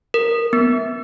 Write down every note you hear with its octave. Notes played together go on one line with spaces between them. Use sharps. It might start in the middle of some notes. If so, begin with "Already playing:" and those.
A#4
B3